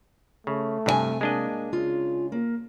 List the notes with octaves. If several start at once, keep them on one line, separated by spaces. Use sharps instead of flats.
C#3 A3
G2 C3 D5 G#5
G#3 A#3 D4 D#5
C#3 F4
A#3